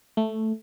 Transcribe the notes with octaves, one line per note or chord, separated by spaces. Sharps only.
A3